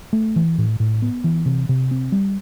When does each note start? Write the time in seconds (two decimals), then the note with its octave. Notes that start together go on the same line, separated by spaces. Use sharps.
0.13 A3
0.36 E3
0.58 A2
0.80 A2
1.02 B3
1.24 E3
1.46 C3
1.69 C3
1.91 C4
2.12 G3